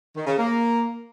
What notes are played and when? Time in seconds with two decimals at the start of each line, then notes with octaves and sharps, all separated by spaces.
0.15 D#3
0.27 C#3
0.38 A#3